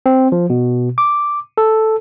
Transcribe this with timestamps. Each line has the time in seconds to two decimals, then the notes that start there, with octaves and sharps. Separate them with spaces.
0.06 C4
0.32 F3
0.50 B2
0.98 D6
1.58 A4